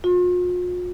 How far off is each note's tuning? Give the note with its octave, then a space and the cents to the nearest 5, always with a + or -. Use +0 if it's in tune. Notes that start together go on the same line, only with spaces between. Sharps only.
F4 +45